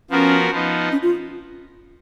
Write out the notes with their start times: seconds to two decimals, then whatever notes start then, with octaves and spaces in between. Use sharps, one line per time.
0.10 F3 B3 C#4 F#4 A#4
0.51 F3 B3 D#4
0.92 C#4
1.02 F4